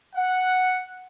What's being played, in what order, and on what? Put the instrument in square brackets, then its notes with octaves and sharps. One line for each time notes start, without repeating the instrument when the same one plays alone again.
[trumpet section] F#5